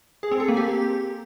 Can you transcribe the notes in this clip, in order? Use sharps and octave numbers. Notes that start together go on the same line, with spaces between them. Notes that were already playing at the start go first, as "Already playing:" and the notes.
G#4
C4
A4
A#3
G4